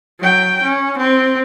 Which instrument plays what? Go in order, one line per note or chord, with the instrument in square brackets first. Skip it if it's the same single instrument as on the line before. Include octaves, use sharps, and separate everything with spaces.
[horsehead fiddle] F#3 G5
C#4
C4